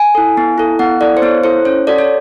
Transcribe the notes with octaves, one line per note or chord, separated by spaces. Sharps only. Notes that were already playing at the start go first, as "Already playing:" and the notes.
Already playing: G#5
E4 A4
B3
E4 A4
B3 F#5
E4 A4 D5
C5
B3 C#5
E4 A4 C5
C#4 C#5
F#4 A4 D5
C#5